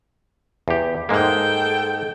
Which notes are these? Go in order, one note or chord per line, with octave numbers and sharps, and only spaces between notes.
E2 G4
G#2 G#3 A#3 A4 G5